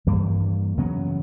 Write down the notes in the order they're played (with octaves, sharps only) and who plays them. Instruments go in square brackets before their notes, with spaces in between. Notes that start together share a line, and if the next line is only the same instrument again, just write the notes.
[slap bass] G2 E3 G3 A#3
E2 C#3 F#3 B3